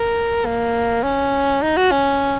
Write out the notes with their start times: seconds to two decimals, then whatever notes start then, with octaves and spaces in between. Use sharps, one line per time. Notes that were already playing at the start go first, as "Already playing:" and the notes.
Already playing: A#4
0.45 A#3
1.03 C#4
1.62 D#4
1.77 F#4
1.91 C#4